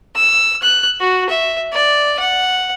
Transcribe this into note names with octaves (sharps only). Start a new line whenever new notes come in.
E6
F#6
F#4
E5
D5
F#5